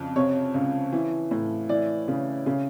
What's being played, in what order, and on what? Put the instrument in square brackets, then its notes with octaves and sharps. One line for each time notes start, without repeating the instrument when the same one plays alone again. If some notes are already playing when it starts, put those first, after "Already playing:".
Already playing: [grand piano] F2 C#3
C3 C#5
C#2
E3
A2
E3 D5
C#3
C#3